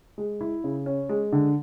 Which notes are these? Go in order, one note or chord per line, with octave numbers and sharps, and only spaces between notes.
G#3
E4
C#3
C#4
G#3
D3